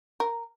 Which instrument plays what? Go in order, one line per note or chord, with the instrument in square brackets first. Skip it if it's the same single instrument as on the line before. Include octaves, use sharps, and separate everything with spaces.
[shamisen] A#4